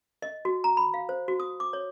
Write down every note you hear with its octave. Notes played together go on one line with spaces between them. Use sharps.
D#5
F#4
A#5
B5
F5
C5
F#4
D#6
D6
C#5